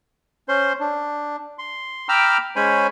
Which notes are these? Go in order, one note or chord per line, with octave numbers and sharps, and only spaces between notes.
C#4 C5 C6
D4
C6
G5 A#5 B5 D6 E6 F6
G#3 C#4 C5 C#5 G#5 B5